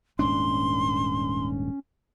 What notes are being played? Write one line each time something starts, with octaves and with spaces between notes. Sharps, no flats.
D#1 G#2 C#4 D4 C6